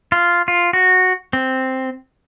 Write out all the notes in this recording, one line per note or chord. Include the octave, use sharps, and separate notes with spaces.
F4
F4
F#4
C4